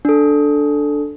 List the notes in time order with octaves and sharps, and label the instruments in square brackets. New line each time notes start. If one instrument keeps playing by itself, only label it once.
[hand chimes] D4 A4